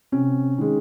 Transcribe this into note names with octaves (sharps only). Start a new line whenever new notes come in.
C3 C#4
D#3 G#3